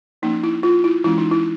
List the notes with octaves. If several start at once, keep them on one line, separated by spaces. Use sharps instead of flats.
F3 A#3 C#4 D#4
E4
F4
E4
E3 G#3 C#4 E4
D#4
E4